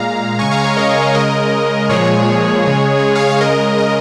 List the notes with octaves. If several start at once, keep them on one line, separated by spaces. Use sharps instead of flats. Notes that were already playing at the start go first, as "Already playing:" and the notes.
Already playing: A#2 G#3 F5 A#5
C#3 G#3 G#5 C#6
F5 A#5
C#5 F5
A#4 D#5
C#3 G#3 A#4 D#5
A#2 F3 G#3 G#4 C#5
C#3 G#3
C#5 F5
C#5 F5
C#3 G#3 A#4 D#5
A#4 D#5